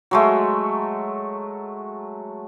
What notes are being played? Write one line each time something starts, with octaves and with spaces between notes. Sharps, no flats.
F#3 G#3 A3